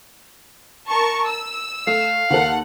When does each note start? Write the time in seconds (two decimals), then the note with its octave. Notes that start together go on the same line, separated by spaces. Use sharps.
0.89 A#4 A5 C#6
1.27 E6
1.87 A3 F5
2.30 D#2 A#3 A4 F#5